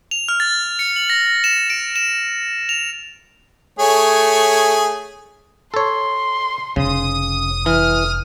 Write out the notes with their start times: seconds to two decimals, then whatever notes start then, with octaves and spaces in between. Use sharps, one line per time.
0.11 F7
0.28 F6
0.40 A6
0.79 C#7
0.96 F#7
1.10 A#6
1.44 E7
1.70 D7
1.96 E7
2.69 F7
3.79 A3 G#4 C#5
5.74 A4 C#5 C6
6.76 F1 C#3 D#6
7.66 E3 F6